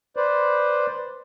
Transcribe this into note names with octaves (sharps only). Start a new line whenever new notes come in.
B4 C5 D5